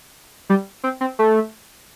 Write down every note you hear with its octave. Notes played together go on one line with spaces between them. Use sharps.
G3
C4
C4
A3